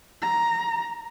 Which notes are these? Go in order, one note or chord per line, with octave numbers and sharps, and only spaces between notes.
A#5